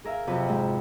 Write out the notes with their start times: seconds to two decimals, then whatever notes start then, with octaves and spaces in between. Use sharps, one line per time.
0.04 G#4 A#4 E5 F5
0.27 F2 C3 F#3 B4
0.49 G#2